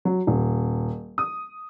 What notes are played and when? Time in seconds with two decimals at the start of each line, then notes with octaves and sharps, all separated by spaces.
0.05 F#3
0.27 D#1
1.18 D#6